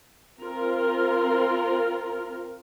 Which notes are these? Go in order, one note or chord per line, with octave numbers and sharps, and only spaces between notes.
C4 F4 A#4